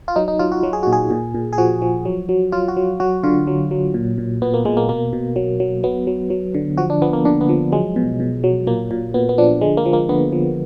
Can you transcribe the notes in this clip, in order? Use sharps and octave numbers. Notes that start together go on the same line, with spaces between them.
F4
F#3 D#4
D#4
F#3 F4
F#4
F#3
G#4
A#2 F#4
G#4
A#2
A#2
G#4
F3 F#4
F3
F#3
F#3
F#3 F4
F#4
F#3
F#3 F#4
D3 F4
F#3
F#3
A#2
A#2
A#2 B3
A#3
A#2 G#3
A#3
B2 A#3
B2
F#3
F#3
F#3 B3
F#3
F#3
D3
F3 F#4
D4
F3 B3
A#3
D3 D4
B3
F3
F#3 G#3
B2
B2
F#3
A#2 A#3
A#2
A#2 B3
B3
F3 D4
D3 G#3
A#3
F3
A#3
D3 B3
F3